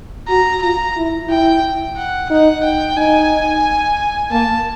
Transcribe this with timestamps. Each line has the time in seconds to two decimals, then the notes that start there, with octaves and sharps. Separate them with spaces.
0.28 F#4 A#5
0.62 F4 A#5
0.97 E4
1.29 E4 G5
1.97 F#5
2.30 D#4 F#5
2.64 G5
2.97 D#4 G#5
4.31 A#3 A5